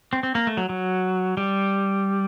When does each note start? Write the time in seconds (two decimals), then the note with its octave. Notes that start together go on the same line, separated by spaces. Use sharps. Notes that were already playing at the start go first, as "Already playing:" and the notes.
0.13 C4
0.23 C4
0.35 A#3
0.47 A3
0.57 F#3
0.69 F#3
1.37 G3